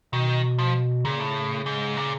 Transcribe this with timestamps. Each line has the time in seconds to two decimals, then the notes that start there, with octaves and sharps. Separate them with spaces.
0.13 B2 D#3
0.59 F3
1.05 A#2 C#3
1.20 A2
1.66 G#2
1.97 A#2